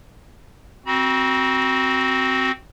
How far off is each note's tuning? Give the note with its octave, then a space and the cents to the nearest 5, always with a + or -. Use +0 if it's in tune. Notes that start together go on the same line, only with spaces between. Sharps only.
C4 +0 F#4 +10 B5 -45